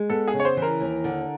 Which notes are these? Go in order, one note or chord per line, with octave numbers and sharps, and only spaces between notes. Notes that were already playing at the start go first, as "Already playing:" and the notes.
Already playing: G#3
B3 A4
G#4
C#3
C#5
C5
E3
A#4
D#2
D3